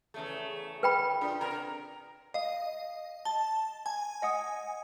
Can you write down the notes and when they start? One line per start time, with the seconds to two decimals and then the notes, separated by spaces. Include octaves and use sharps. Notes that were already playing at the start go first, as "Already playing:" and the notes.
0.14 E2 C#3 A3
0.83 B4 G5 B5
1.21 D4 F4
1.41 C3 A#4
2.34 D#5 F5
3.25 A5 G7
3.86 G#5
4.22 D#5 F#5 D#6